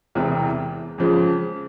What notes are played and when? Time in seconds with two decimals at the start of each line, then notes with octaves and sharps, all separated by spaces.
0.15 E1 E2 C3 E3 G#3
0.98 F2 C#3 F3 G#3